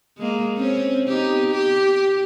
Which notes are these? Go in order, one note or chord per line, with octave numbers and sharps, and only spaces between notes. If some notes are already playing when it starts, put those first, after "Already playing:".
G#3 A#3
C4 C#4
B3 D#4 G4
G4